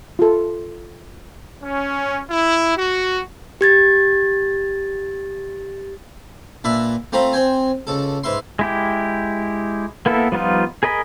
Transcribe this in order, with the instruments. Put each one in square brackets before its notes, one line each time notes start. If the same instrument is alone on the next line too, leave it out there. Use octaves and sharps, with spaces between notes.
[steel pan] F4 A4
[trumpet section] C#4
E4
F#4
[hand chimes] G4 G#6 A6
[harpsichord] A#2 D4 B4 E5
A3 C4 F4 A#5 B5
C4 G5 G#5
C#2 A4
G#2 B4 E5 C6
[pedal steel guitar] G#3 E4 G4
A#3 B3 E4 A4
F3 G3 B3 D#4 F4
G#4 A#4 D#5 B5